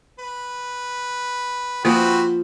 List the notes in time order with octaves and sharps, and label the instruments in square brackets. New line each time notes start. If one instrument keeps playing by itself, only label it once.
[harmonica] B4
[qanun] F3 [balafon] A#3 F4 C5 [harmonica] C4 F#4 B4